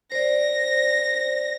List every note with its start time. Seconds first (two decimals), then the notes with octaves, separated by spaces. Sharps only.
0.12 C5 D5 A#6